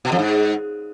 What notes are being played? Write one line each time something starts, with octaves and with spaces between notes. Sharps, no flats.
B2
F2
G#2